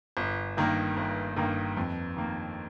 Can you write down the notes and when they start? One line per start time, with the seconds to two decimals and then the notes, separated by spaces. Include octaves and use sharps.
0.17 G1
0.57 G2 D#3 A#3
0.97 G1
1.36 G2 D#3 A#3
1.77 F2
2.17 D#3 A#3